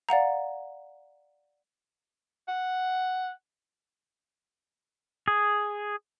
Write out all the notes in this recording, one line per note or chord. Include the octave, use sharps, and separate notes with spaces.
D5 F5 F#5 A#5
F#5
G#4